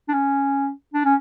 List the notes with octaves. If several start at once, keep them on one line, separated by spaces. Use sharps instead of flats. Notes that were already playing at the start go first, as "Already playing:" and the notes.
D4
C#4
D4
C#4